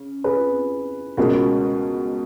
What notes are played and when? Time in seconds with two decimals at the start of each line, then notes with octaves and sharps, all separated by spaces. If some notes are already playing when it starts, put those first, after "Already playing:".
Already playing: C#3
0.24 G#4 B4
1.17 C#2 B2 G#3 C#4 F#4 A#4